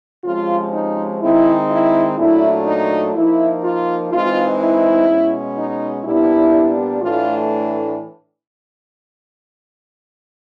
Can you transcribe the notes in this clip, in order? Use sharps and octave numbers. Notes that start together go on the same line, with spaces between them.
C3 F3 G#3 C#4 F4
D#4
D#3 G#3 C4 D#4 E4
E4
A#2 F#3 A3 D4 E4
D#4
F3 A#3 D#4 E4
F4
E3 G#3 C4 D#4 F4
E4
B2 G#3 C#4
D#4
A#2 G3 B3 D4 E4
A2 E3 A3 D4 F4